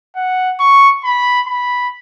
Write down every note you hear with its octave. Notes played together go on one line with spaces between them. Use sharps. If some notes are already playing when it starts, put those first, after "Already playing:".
F#5
C#6
B5
B5